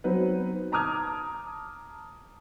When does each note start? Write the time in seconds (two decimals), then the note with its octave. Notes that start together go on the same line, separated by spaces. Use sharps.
0.04 F#3 B3 C4 D#4 B4
0.72 A5 A#5 D6 D#6 F6 G#6